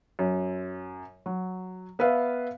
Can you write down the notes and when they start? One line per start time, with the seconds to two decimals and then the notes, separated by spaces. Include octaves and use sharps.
0.19 F#2
1.26 F#3
1.99 B3 B4 E5 F5